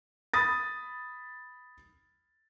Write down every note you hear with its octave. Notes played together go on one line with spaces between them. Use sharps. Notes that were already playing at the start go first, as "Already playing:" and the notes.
B5 D#6 A6